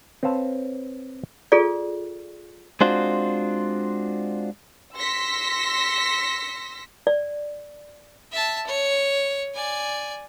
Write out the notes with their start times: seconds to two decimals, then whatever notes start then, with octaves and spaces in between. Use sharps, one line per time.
0.23 C4 B4 C#5 F5 A5
1.52 F4 G#4 A4 D5
2.81 G#3 C4 D4 F4 F#4 C5
4.96 C6 E6 A#6 B6 C#7
7.07 D5
8.32 E5 A5
8.67 C#5
9.54 D5 G#5